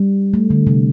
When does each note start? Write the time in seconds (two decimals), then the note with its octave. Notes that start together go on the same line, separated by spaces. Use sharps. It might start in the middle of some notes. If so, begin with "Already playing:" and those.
Already playing: G3
0.34 A3
0.50 D3
0.67 C3